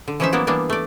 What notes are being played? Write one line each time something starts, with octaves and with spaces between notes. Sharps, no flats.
D3
E3 F3 C#4 D#4 C5 E5
F#3 A#3 B3 E4 D5
E3 G3 A#3 B3 D4
A3 D5